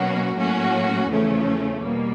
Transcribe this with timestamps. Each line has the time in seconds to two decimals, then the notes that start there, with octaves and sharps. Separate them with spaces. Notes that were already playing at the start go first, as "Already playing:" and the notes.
Already playing: B2 F#3 A#3 C#4 F#4
0.37 A2 F#3 A#3 C#4 F#4
1.10 E2 C#3 F3 A3 C#4
1.83 B2 G3 A#3